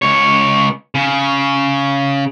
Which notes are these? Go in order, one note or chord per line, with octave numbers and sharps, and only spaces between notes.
C#2 C#5
C#3